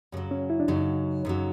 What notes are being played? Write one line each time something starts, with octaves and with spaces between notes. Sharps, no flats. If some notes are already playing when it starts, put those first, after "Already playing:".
F#2 C#3 F#3
C#4
E4
D4
F#2 C#3 F#3 D#4
F#2 C#3 F#3